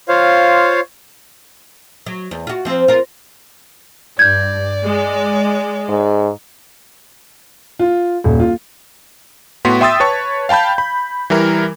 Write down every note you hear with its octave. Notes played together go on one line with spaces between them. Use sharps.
F4 C5 C#5 F5
F#3
E2
F4 F#4
F3 C4
F4 A#4
G2 D5 G6 G#6
G#3
G#2
F4
D#1
F4
A2 B3 F#4 C6 B6
E5 G5 C6 D#6 E6 A6
B4 C#5 A5 C#6
F5 G5 A5 B5 G6
B5
E3 G3 E4 A#4